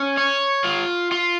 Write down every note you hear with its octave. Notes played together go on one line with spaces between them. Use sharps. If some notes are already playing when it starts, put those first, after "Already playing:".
Already playing: C#4
C#5
F4
F4